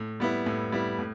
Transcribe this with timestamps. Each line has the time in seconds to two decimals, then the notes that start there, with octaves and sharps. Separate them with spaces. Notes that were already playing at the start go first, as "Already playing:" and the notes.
Already playing: A2
0.20 G3 B3 E4
0.46 A2
0.72 G3 B3 E4
0.99 A2